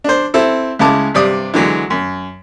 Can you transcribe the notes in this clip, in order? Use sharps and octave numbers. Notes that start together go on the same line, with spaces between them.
D4 C5
C4 E4 A4
C#2 C#3 G#3 E4 A5 D6
G2 C3 D5 D#6
D3 E3 F#3 G#3
F#2